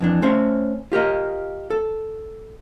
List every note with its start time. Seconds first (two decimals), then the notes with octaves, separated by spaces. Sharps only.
0.01 F2 E3 D4
0.22 A3 C#4 C5 C#5 E5
0.92 F4 G4 A#4 D#5
1.70 A4